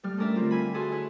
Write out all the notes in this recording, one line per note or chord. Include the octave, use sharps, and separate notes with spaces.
A2 G3 F6
A3 C#4 D4 A#4 D5 E5
D3 G3 C4 F4
E5 F5 G#5 B5
F#4 G#4 A4 E5 G#5 C6
E4 B4 C#5 E5